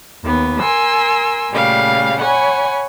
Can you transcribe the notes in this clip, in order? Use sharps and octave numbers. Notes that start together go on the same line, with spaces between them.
D#2 B3
A#4 G#5 C6 E6
A#2 C#3 G3 A3 F5
C#5 F#5 G#5 B5